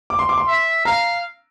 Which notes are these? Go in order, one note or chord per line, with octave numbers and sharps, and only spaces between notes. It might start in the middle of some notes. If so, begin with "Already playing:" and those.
D6
C6
D6
C6
E5
F5 A#5